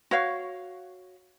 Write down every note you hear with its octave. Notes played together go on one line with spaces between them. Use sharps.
F#4 C#5 F5